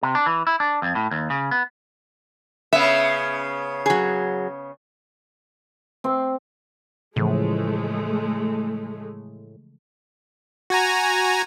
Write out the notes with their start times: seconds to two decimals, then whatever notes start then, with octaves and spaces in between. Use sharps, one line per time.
0.03 C3
0.15 D4
0.26 E3
0.47 E4
0.60 D4
0.82 F2
0.95 A2
1.11 D#2
1.30 C#3
1.51 B3
2.73 C#3 B3 E5
3.86 F#3 G#4
6.04 C4
7.16 A2 C#3 E3 F3 G#3 A3
10.70 F#4 G#5 A#5